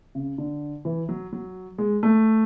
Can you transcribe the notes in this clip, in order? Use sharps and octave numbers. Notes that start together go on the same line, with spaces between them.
C#3
D3
E3
F#3
F#3
G#3
A3